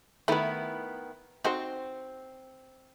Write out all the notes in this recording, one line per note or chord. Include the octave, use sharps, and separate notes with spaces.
D#3 A3 B3 E4 B4
C4 D#4 F#4 C5